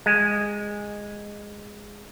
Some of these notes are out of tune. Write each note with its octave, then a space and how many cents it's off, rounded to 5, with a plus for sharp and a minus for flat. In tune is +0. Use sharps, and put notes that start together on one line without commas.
G#3 -10